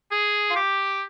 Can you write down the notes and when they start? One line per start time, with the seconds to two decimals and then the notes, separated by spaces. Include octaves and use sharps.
0.12 G#4
0.49 F4
0.56 G4